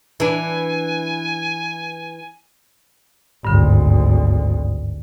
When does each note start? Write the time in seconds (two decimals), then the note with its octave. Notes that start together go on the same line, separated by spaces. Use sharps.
0.20 E3 D4 G#5
3.45 G#1 D2 G2 D3